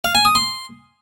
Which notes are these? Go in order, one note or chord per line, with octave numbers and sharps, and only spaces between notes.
F5
G#5
D#6
C6